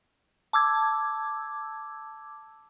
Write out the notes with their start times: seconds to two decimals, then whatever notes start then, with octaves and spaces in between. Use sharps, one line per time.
0.53 A5 D6 E6 G#6